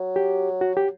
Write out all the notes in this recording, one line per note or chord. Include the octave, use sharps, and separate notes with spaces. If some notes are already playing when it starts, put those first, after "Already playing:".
Already playing: F#3
G4
F#4
G4